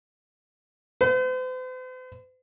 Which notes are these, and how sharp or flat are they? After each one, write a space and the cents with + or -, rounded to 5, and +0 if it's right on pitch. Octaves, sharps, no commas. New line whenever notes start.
C5 -45